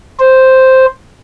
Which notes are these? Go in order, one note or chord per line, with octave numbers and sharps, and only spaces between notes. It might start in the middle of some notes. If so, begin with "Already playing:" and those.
C5